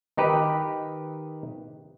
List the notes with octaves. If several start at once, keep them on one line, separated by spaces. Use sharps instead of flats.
D#3 D#4 G4 B4